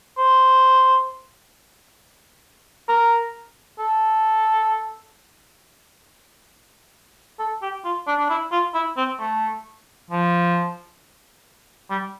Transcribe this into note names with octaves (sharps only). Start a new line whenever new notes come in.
C5
A#4
A4
A4
G4
F4
D4
D4
E4
F4
E4
C4
A3
F3
G3